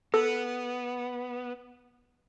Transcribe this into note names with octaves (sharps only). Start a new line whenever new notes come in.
B3 A4